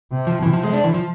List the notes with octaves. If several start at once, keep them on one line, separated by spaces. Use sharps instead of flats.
C3
F3
C3 E3
F3
G#3
D4
E3
F3